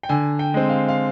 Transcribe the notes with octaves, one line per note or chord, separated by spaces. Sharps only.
G5
D3 G#5
G5
G#3 C4
F5
F5